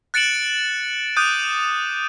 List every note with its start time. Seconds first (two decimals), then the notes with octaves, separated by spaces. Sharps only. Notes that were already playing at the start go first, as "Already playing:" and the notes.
0.14 F#6 A6 C#7 D7 E7 F#7
1.16 D6 D#6 F#6 G6 D#7